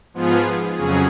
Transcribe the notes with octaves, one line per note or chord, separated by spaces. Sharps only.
G#2 F3 B3 F4 G#4
F2 C#3 F#3 C#4 G#4